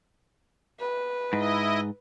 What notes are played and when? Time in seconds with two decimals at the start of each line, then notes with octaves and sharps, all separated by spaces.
0.80 B4
1.33 G#2 E4 D#5